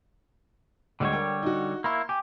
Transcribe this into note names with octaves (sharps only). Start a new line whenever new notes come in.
D2 D3 G3 G#3 C#5
A#4 G5
D#4 F#4
A#3 E4 C6 C#6
G4 G#5